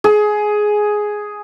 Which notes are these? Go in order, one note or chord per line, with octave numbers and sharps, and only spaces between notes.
G#4